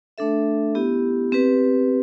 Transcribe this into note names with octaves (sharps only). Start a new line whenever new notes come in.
A3 D4 A4 E5
B3 E4 G4
C4 G4 B4